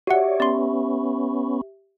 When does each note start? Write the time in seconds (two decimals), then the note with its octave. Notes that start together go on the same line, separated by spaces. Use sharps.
0.07 F#4 G4 C#5 D5 E5 F#5
0.40 B3 C#4 D5 C6